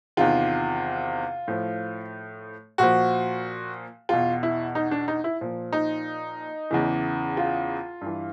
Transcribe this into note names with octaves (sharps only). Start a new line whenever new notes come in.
E2 C3 D#3 F4
A2 F3
A#2 F3 F#4
E2 B2 F4
E4
D#4
D4
D#4
E4
A#2 F3
D#4
E2 C#3 E3
F4
G2 E3